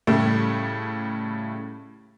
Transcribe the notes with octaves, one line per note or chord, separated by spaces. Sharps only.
A2 C#3 G3 A3